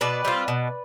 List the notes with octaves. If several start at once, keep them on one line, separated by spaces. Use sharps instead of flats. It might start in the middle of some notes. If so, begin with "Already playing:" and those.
B2 B4 D5
G3 C4 F4
B2